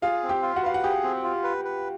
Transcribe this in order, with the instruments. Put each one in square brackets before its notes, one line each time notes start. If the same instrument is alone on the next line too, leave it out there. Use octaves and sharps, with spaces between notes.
[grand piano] F4 F5 [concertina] G#4
[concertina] C4
[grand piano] G4 G5
[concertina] F4
[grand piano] F#4 F#5
[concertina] B4 [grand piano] F5
[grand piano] F#5
[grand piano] G4 G5 [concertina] G#4
[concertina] C4
F4
B4
B4